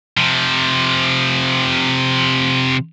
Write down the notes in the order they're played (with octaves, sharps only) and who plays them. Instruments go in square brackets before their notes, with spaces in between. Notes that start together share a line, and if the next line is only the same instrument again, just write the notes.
[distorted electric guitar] C3 F3